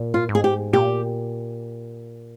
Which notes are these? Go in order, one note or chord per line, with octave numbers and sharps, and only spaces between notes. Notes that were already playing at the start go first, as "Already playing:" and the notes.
Already playing: A#2
F4
G#2
G#4
G4
A#2 G4